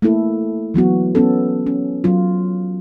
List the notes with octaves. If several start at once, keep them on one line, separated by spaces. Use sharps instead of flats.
A3 A#3 E4 A4
E3 F#3 B3 F#4
B3 C#4 A4
C#4
F#3 F4